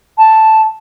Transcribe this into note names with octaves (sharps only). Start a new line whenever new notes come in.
A5